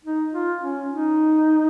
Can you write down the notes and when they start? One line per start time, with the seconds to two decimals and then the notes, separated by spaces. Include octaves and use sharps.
0.05 D#4
0.33 F4
0.61 C#4
0.90 D#4